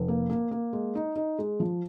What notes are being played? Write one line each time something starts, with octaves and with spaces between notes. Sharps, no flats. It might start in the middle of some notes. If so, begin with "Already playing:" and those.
Already playing: F1
A#3
A#3
A#3
G#3
D#4
D#4
G#3
F3